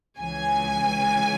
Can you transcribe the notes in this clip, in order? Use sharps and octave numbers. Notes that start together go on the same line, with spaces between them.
C#2 C#3 E3 G#5